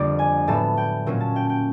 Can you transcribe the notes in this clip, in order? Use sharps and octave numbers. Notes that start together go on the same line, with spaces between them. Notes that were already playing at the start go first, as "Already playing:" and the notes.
Already playing: F2 D3 G3 A#3 D5
G#5
A2 F#3 B3 A5
G5
A#2 F#3 A#3 C#4
A5
G5
G5